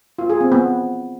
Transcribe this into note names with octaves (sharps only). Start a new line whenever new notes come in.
F4
G#4
C4
B3